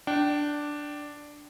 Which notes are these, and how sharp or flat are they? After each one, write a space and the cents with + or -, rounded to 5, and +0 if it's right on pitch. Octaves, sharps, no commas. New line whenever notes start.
D4 +0 G5 -25